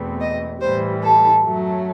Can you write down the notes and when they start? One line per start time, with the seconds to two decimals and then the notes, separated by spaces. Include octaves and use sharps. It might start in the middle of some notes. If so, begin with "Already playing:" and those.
Already playing: E2 B2 A3 C4
0.20 D#5
0.61 A2 E3 G3 C5
1.02 A4
1.43 F#2 F#3 A3